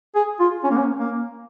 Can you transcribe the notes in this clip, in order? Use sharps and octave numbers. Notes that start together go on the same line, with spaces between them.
G#4
F4
C#4
A#3
C#4
A#3